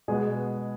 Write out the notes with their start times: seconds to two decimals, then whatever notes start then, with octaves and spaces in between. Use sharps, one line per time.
0.08 B2 G#3 B3 G#4